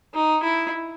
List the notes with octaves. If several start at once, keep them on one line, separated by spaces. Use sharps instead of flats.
D#4
E4